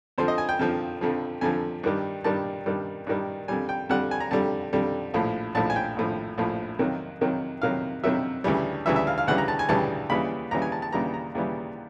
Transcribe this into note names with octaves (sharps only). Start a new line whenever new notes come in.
F2 D3 F3 C5
D#5
G#5
G5
F2 D3 F3
F2 D3 F3
F2 D3 F3 G#5
G2 D#3 G3
G2 D#3 G3 A5
G2 D#3 G3
G2 D#3 G3
F2 D3 G3 G#5
G5
F2 D3 G3 F#5
G#5
A#5
F2 D3 G3 A5
F2 D3 G3
A#1 A2 F3
A#1 A2 F3 A5
G#5
G5
A#1 A2 F3
A#1 A2 F3
F2 C3 D#3 F#3
F2 C3 D#3 F#3
F2 C3 D#3 F#3 F5
F2 C3 D#3 F#3 E5
D2 C#3 E3 G3
D2 C#3 E3 G3 E5
E5
F5
F5
D2 C#3 E3 G3 F#5
A#5
A5
G#5
D2 C#3 E3 G3 A5
D#2 C#3 E3 G3 B5
D#2 C#3 E3 G3 A#5
G#5
A5
A5
D#2 C#3 E3 G3 A#5
A#5
D#2 C#3 E3 G3